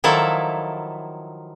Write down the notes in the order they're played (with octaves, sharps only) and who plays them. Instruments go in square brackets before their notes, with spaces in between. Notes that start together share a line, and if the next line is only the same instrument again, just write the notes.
[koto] D#3 F3 F#3 E4 A4